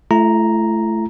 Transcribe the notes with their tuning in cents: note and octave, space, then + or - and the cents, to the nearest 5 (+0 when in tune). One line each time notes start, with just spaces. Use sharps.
A3 -15 E4 +40 A#5 +0